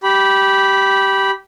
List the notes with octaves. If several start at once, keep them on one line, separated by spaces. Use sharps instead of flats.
G4 B5